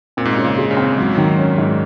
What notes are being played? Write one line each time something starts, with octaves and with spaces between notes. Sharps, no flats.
A#2 C4
G#2
A#2
C#3
A#2
G#3
C#3
C4
G#2 F#3
D#3 F#3
C#4
G#2